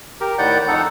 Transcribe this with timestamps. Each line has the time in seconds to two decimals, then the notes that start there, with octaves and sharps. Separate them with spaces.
0.21 G4 A#4
0.38 A2 D#3 D5 F#5 G6
0.68 F2 D#4 A4 F#5